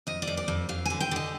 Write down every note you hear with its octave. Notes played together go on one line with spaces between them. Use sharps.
F2 D#5
D5
F2
D5
F2
F2 F5
D3 G#5
G5
D3 D#5